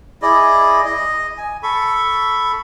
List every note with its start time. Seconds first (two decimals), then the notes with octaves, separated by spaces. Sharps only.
0.22 E4 G#4 D5 D#5
0.85 D#5
1.38 G#5
1.63 A4 B5 C#6